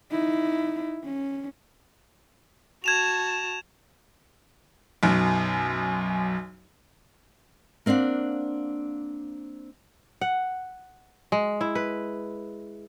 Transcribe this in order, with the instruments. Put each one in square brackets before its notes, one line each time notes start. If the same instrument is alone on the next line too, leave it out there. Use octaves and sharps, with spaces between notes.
[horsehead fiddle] D#4 E4
C#4
[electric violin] F#4 A5 [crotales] G#6 E7 F7
[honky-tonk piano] B1 F#2
[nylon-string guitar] A#3 C4 D4 F5 F#5
[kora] F#5
G#3
E4
B4